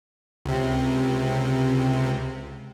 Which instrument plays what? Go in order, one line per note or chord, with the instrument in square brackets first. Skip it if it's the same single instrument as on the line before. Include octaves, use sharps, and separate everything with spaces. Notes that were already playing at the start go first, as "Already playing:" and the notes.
[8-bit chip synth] C#2 C3